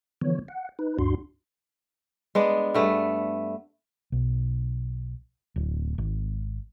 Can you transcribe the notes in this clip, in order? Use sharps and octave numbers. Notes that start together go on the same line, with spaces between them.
D3 E3 F3 B3 C#5
F#5
D#4 B4
D2 G2 D4 F#4 C6
G#3 B3 D4
G2 A3 B3
B1
D1
G#1